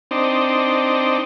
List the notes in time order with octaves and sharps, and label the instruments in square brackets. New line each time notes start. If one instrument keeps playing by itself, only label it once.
[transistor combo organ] C4 D4 D#4